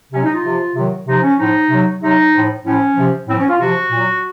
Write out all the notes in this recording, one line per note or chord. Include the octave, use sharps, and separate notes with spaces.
C3 F#3 C#4
D#4
F4
C3 F3
C3 D#3 F#3
C3 F3 D#4
C#4
A2 F3 D#4
C3 F#3
C3 F#3 D#4
A2 F3
A2 F3 C#4
C3 F3
A2 F3 C4
C#4
F4
C3 F3 F#4
A#2 F#3